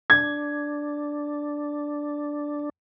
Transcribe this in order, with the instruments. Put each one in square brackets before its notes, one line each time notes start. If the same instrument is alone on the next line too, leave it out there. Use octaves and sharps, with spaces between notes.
[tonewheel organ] D4 [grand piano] G#6